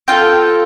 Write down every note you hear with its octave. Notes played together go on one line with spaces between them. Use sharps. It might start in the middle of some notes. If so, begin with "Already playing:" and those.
C4 F4 A4 G5